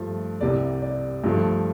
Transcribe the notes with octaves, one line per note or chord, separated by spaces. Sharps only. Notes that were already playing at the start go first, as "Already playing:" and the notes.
Already playing: G2 F3 A3
C2 C3 G3 D5
D5
G2 F3 A3